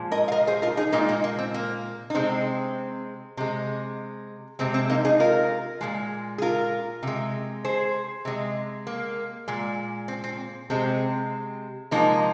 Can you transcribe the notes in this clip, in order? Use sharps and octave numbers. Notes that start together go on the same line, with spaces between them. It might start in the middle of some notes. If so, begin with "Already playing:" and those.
Already playing: A#2 F3 G#3
A#4 D#5
F5
A#4 D#5
G#4 C5
F4 A#4
D#4 G#4
A#2 G#3 A#3 D#4
A#3 D#4
A#3
C4
A#3
D#4
C3 G#3 C4
C3 G#3
C3 G#3 C4
C4
A#3 D#4
D#4 G#4
F4 A#4
A#2 F3 G#3
G#4
F4 A#4
C3 G#3
G#4 C5
C3 G#3
A#3
A#2 G#3
C4
C4
C3 G#3 C4
C3 F3 G#3 A#3 D#4